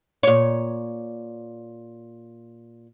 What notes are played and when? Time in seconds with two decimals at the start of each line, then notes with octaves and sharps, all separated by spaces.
0.23 A#2 C#5